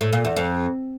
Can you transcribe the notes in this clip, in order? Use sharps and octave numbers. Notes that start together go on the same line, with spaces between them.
A2
A#2
E2
F2